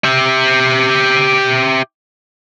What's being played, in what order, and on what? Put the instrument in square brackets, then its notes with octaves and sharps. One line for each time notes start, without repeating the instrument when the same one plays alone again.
[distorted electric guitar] G4 E5